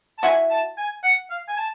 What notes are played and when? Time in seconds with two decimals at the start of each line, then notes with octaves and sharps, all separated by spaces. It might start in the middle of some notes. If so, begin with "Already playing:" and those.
0.18 A5
0.23 E4 F#4 G#5
0.50 A5
0.77 G#5
1.03 F#5
1.30 F5
1.48 G#5
1.57 A5